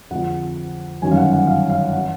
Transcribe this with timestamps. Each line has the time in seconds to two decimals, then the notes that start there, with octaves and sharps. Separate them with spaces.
0.11 F2 D3 F3 G#3 F#5
1.02 G1 F#2 D#3 G#5
1.11 F5
1.17 F#5
1.33 F#5
1.47 F5
1.70 F5
1.93 F#5
1.97 E3